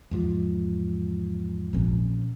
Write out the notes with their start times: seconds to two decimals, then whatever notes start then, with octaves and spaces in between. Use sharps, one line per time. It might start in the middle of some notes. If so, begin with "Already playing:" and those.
0.11 E2 G#2 F3
1.73 A#1 C#4